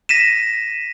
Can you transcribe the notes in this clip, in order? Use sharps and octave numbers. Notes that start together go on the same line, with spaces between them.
A#6 B6 D#7 E7